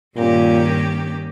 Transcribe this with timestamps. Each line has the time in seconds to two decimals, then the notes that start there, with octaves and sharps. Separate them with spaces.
0.17 G2 A#2 D#3 A#3 C#4 G4